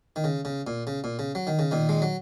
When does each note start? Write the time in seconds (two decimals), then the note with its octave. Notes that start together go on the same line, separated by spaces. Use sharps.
0.16 D#3
0.24 C#3
0.45 C#3
0.67 A#2
0.87 C#3
1.04 A#2
1.19 C#3
1.35 F#3
1.47 D#3
1.59 C#3
1.71 A#2 D#3
1.89 G#3
2.02 F#3